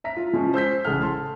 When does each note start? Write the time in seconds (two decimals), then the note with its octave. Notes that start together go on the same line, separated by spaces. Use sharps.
0.04 E5 A#5 B6
0.17 F4
0.33 F3 G#3 C#4
0.54 C5 E6 G6 B6
0.85 A1 C#3 G#4 A4 F#5 F6
1.02 A5 C6